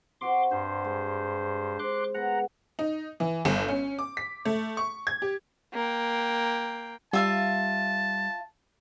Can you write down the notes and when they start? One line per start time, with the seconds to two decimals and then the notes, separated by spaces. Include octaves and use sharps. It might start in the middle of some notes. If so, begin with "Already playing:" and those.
0.21 C3 F#4 C5 C6 D6
0.51 G2 C5 C6
0.85 G#3
1.79 C5 C6 D6 F#6
2.14 G#3 B3 F#5 A#5
2.79 D#4
3.20 E3
3.45 G1
3.68 C#4
3.99 D6
4.17 B6
4.45 A3
4.77 C#6
5.07 G#6
5.22 G4
5.74 A#3 G5
7.13 G3 F4 E5 F5 A5